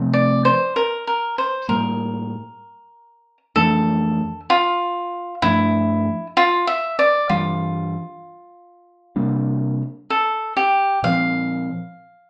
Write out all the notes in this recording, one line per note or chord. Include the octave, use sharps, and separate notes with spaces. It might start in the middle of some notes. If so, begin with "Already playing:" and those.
Already playing: C3 F3 A3 C4
D5
C5
A#4
A#4
C5
A2 G3 A#3 A#4
F2 E3 A3 D4 A4
F4
G2 F3 A3 D4 E4
F4
E5
D5
G2 E3 G3 F4
C3 G3 A#3 D4
A4
G4
A#2 F3 C4 F5